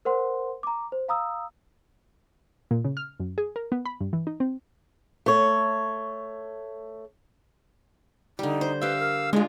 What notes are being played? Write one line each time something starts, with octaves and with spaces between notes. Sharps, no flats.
A#4 C5 F#5 C6
A#5 D6
C5
F5 A#5 D#6 E6
A#2
C#3
F6
F#2
G#4
A#4
B3
B5
G2
E3
D#4
C4
A3 C#5
D3 G3 D#4
C5
G4 B4 E5 F5 E6
A#4
G#3 D4 F4